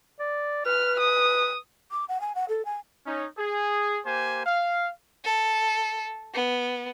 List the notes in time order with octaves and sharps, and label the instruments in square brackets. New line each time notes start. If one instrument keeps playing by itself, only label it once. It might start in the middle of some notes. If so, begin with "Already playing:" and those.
[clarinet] D5
[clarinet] B4 [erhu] F6
[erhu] D#6
[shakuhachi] D6
F#5
G#5
F#5
A4
G#5
[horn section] C#4 D#4
G#4
A#3 G4 C5 G#5
F5
[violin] A4
B3